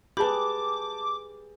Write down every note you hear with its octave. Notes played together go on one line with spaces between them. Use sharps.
G4 G#4 B4 A5 B5 D6 G6